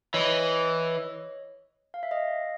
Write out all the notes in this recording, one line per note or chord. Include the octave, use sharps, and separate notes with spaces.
E3 C#5 D#5
F5
E5
D#5 F5